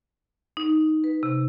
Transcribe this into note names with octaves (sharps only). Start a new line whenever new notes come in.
D#4
B4
C3